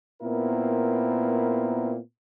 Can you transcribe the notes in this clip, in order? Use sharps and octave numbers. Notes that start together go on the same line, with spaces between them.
A#2 B3 C4 E4 A#4